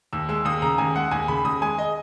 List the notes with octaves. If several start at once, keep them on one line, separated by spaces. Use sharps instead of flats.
D#2 E6
G#3 E6
D#2 D#6
C#3 A#5
D#2 G#5
G#3 F#5
D#2 G#5
C#3 B5
D#2 D#6
G#3 G#5
D#5